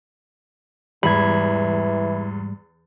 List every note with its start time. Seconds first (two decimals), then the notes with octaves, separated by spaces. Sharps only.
1.03 E2 G#2 E3 G3 B5 G#6